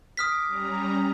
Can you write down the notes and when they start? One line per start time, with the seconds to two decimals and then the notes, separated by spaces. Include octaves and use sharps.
0.17 D6 D#6 F6 B6
0.47 G3 C#4 A#5